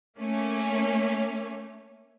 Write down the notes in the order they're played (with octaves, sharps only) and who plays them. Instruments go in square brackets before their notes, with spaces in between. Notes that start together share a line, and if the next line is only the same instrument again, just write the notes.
[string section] A3 A#3 C#4